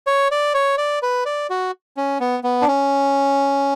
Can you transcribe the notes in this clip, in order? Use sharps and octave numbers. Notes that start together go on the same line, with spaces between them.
C#5
D5
C#5
D5
B4
D5
F#4
C#4
B3
B3
D4
C#4